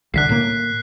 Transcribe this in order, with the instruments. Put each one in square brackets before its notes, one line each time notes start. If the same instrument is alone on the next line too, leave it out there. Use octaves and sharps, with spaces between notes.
[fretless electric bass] C2 D3 [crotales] F#6 B6 C7
[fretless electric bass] A2 A#3